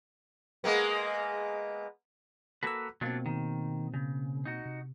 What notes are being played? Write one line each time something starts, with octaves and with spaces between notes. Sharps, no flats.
G#3 A#3 B3
A#3 F#4 A4 B4 E6
B2 F#3 A#3 C4 D4 F4
D#3
C#3
D#4 F#4
C3